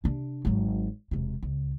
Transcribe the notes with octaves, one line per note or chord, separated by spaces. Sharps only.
C3 D4
G#1 F#3
E1 C3
C#2